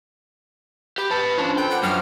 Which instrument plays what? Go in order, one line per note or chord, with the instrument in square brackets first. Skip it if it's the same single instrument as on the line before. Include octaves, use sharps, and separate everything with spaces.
[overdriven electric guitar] G4 [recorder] B5
[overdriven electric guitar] B4 A5
[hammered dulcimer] F3 B4 [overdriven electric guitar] C#4 D4
[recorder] A4 [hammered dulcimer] A#4 [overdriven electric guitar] G5
[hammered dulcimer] D4 D5 [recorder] F#5
[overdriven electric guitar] F#2 [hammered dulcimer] F3 [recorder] F6